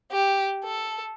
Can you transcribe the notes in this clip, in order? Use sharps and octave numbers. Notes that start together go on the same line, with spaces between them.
G4
A4